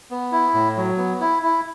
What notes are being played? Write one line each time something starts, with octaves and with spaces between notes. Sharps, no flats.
B3
E4
A2
F#3
B3
E4
E4